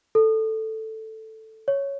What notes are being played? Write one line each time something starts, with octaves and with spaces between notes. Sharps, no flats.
A4
C#5